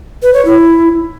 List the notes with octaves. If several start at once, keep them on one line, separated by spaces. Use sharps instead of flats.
B4
C#5
E4